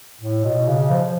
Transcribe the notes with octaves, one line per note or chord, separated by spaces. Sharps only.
A2
B2
C#3
F3